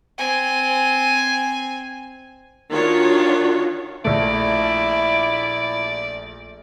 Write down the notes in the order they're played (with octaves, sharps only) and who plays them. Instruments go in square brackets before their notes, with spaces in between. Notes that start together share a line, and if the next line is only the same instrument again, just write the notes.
[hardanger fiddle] C4 G#5
[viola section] D#3 D4 F4 F#4 C#5
[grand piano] A#1 A3 [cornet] E4 [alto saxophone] D5